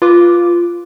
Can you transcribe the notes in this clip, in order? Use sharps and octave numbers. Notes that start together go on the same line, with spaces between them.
F4 B4 D6